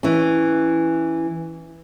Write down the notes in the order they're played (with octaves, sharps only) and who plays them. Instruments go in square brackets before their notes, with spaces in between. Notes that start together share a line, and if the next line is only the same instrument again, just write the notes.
[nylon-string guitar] E3 C#4